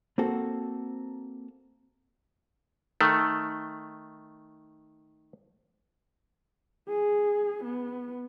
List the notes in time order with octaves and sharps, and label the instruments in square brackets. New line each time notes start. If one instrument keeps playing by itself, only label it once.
[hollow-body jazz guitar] A#3 C4 F#4 A4
[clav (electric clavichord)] D#3 A3
[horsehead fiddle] G#4
B3